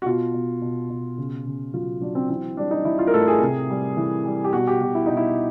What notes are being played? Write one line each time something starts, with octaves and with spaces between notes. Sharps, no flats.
F#4
B2 F4
B2
B2
B2
C#3
C#3
F#3 F4
F#3 D4
C4
E3 C4
G3 D4
D#4
E3 E4
F4
A#4
A2 A4
G#4
C3
G3
E3
G3
G4
B2 F#4
G4
B2 F#4
E4
B2 D#4
E4